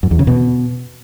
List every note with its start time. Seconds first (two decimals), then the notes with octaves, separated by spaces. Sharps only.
0.03 F#2
0.11 E2
0.19 C#3
0.27 B2